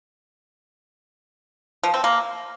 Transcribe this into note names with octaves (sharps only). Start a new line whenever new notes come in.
F3
C4
A#3